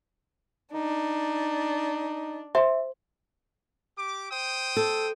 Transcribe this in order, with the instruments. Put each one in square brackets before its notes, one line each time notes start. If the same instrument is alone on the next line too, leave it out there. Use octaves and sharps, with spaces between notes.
[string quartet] D4 [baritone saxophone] D#4
[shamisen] C5 [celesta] E5
[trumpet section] G4 D6
C5 G5 D#6
[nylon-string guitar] A4